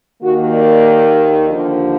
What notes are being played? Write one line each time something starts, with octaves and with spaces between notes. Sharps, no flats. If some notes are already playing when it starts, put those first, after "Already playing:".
D#2 D#3 A#3 F#4
D5
D#2 D3 F3